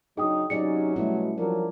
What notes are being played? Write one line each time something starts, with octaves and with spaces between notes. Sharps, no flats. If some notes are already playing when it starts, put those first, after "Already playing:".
C#3 F#3 D4 D#4 G#4 G5 D#6
C3 F#3 C#4 D#4 G#4 D5 D#5 C#7
B2 G3 A3 C#4 E4
F3 F#3 D4 A#4 C#5